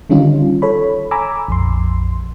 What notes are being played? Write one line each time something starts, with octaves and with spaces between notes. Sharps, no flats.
D3 D#3 G3 C#4 D#4 F4
A4 C#5 B5
G#5 A#5 B5 D6 E6
A#1 F2 C6